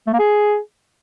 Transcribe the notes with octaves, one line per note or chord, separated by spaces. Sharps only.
A3
A#3
G#4